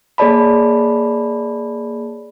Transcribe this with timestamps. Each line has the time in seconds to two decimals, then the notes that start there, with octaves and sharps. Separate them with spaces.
0.18 A#3 G#4 C#5 D5 A5 B5